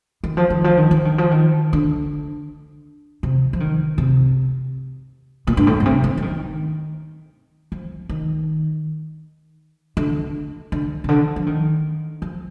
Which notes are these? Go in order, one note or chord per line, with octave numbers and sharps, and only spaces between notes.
D#3
F3
D#3
F3
D#3
F3
D#3
F3
D#3
D3
C3
F3
D#3
C3
A#2
G2
A2
A#2
C3
D#3
F3
D#3
F3
D#3
D3
D3
C3
D3
F3
D#3
F3